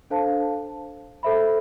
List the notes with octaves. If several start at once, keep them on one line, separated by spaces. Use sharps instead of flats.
D4 A4 C5 F5 A5
A4 C5 E5 B5